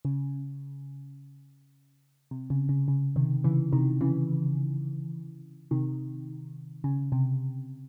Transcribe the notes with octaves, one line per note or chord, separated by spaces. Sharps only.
C#3
C3
C#3
C#3
C#3
C3 D#3
C#3 E3
C3 D#3
C#3 E3
C3 D#3
C#3
C3